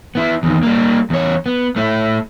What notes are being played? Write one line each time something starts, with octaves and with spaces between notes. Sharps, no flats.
B3 E4
E2 D#3
G3 A#3
E2 C#5
B3
A3 E4